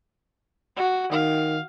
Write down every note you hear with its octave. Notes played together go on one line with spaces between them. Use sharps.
F#4
D#3 F5